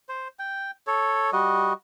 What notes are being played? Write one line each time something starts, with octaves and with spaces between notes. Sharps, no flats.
C5
G5
A4 C#5
G3 F#4 D#5